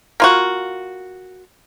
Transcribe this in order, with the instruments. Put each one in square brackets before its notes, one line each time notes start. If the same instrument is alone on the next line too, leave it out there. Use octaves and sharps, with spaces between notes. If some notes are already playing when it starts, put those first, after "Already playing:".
[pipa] A#3 F4 F#4